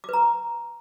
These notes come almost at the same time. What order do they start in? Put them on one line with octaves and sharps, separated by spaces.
D6 B4 A#5